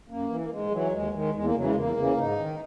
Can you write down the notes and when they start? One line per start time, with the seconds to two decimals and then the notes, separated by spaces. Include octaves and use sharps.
0.08 F#2 A#3
0.29 E3
0.40 A#3
0.51 G#2 G#3
0.71 E3 F#3
0.92 D#2 G#3
1.13 D#3 G#3
1.34 E2 G#3
1.44 A#3
1.55 C#3 E3 F#3
1.65 G#3
1.75 E2 A#3
1.96 C#3 E3
2.17 G#2 D#4
2.38 D#3